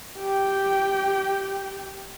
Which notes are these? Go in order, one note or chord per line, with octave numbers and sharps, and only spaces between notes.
G4 G5